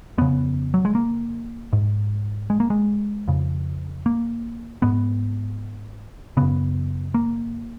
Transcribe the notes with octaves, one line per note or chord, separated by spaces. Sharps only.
F2 C#3 B3
F#3
G#3
A#3
G#2
G#3
A#3
G#3
F2 C#3
A#3
G#2 B3
F#2 C#3 B3
A#3